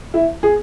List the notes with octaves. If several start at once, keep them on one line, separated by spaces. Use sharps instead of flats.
E4
G#4